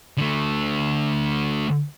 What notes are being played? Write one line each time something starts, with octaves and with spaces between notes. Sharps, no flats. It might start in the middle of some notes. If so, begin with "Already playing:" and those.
D3 A3